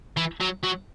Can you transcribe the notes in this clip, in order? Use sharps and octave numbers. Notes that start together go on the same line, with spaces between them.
E3
F#3
F#3